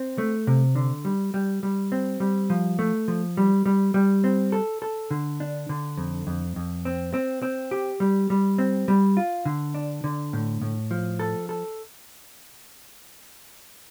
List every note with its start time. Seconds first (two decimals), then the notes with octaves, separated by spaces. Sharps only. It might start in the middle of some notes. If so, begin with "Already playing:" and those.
Already playing: C4
0.18 A3
0.47 C3
0.75 D3
1.05 G3
1.34 G3
1.63 G3
1.92 C4
2.20 G3
2.50 F3
2.79 A3
3.08 F3
3.37 G3
3.66 G3
3.94 G3
4.24 C4
4.52 A4
4.82 A4
5.11 D3
5.40 D4
5.69 D3
5.97 F2
6.27 F2
6.56 F2
6.85 C4
7.14 C4
7.42 C4
7.71 G4
8.00 G3
8.30 G3
8.58 C4
8.88 G3
9.17 F4
9.46 D3
9.74 D4
10.04 D3
10.33 A2
10.62 A2
10.91 F3
11.19 A4
11.49 A4